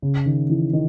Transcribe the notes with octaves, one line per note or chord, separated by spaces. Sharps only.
C#3
D#3
E3
D#3